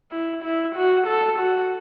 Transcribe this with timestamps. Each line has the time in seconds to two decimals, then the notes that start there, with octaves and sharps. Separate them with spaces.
0.11 E4
0.43 E4
0.75 F#4
1.07 A4
1.39 F#4